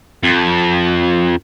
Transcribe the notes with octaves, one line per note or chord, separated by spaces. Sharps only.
F2